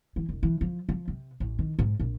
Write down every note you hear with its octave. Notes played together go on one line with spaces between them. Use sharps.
E3
E1
E3
F3
F3
C3
A1
D#3
G#2
A#1